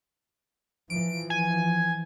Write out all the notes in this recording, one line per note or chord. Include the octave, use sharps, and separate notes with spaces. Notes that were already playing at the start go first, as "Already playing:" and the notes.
E3 F3 D7
G#5